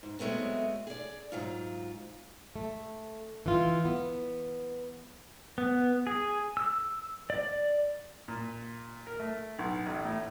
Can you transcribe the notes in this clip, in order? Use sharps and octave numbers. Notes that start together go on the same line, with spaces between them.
G#2
F#3 G#3 A3 B3 C4
G#4 D5
G#2 F#3 F4
A3
E3 F4
B3
B3
G#4
E6
D5
A#2
A#4
A3
B1
A1
A2